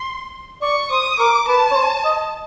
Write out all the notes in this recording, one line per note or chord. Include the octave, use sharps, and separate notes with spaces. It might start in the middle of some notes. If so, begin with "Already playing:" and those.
Already playing: C6
D5 C#6
C5 D#6
A#4 D6
B4 A5
C#5
C5
D#5